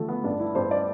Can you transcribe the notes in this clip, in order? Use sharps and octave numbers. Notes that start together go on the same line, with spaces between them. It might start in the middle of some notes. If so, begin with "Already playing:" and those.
Already playing: D3 F3 A3
B3
G2 D4
E4
G2 C5
D5